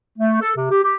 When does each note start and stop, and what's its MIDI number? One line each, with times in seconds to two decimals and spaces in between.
0.18 0.36 57
0.40 0.51 69
0.55 0.67 48
0.70 0.82 67
0.83 0.96 67